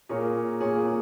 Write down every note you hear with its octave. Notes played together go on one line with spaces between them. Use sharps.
A#2 A#3 G#4 C#5
A#2 A#3 G#4 C#5
G#4 C#5